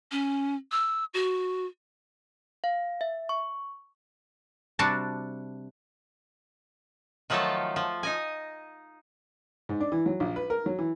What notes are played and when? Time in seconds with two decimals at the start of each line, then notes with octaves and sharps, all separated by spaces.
0.12 C#4
0.72 E6
1.14 F#4
2.64 F5
3.01 E5
3.29 C#6
4.79 C3 G3 D4 F#4 A5
7.30 D#3 F3 F#3 A3 F4 A4
7.76 F3
8.03 D#4 D#5 G#5
9.69 G#2
9.80 D4
9.92 E3
10.06 F#3
10.20 A#1
10.36 B4
10.50 A#4
10.66 F#3
10.79 E3